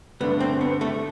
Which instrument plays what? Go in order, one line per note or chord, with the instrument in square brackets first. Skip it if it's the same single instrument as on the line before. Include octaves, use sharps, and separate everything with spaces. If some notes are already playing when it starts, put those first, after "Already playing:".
[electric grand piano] G2 D3 A3 D4 [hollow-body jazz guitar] B3
[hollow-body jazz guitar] C4
B3
A3